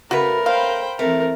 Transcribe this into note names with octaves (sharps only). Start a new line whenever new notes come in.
C#3 A3 F#4 A#4 B4
C5 F5 G5 B5
E3 A3 C4 A#4